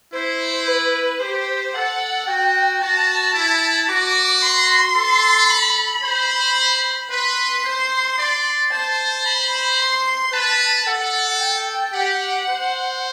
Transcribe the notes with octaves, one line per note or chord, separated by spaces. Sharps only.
E4 C5
B4
G4 C5
A4 F#5
F#4 G5
F#4 A5
E4
F#4 D6
C6
A4
B5
C5
B4 C6
C5
D5
C5 A5
B5
C6
B4 A5
A4 F#5
G5
G4 F#5
C5